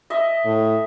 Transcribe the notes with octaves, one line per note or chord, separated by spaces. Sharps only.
D#5 E5
A2